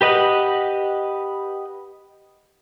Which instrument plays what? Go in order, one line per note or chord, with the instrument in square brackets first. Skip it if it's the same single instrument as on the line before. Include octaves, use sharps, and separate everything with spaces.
[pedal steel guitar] G4 B4 D#5 F#5